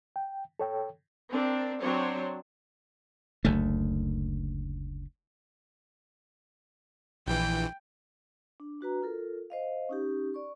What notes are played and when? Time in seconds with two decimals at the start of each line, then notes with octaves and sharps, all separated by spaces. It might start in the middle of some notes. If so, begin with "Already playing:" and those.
0.16 G5
0.60 A4 C#5 G5
1.31 C4 D4 A#4
1.81 F#3 C4 D4 F#4 C5 C#5
3.45 F#1 D2 A3
7.27 A#1 E3 G5
8.60 D4
8.81 D4 F#4 B4 A#5
9.03 F4 A4 A#4
9.50 C5 D#5 F5
9.89 C#4 D#4 G4
10.34 D5 C#6